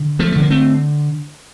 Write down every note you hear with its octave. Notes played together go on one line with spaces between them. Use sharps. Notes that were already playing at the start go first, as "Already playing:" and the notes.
Already playing: D3
F3 A3
D3 A3
A#3
A3 C4